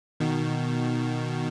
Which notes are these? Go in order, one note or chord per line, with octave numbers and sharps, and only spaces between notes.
B2 D#3